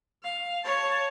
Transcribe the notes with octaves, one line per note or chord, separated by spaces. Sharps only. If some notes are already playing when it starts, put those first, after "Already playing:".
F5
C#5 A5